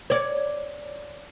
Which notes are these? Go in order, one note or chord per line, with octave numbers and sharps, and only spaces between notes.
C#5 D5